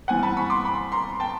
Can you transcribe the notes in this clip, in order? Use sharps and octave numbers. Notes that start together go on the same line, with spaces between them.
E3 G3 C4 F#5 G#5
A5 B5
B5 C#6
C6 D6
B5 C#6
A#5 C6
G5 A5